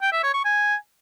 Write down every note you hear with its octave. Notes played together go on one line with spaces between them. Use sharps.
G5
E5
C#5
C#6
G#5